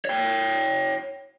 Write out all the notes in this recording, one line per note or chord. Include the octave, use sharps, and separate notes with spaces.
C#5 G5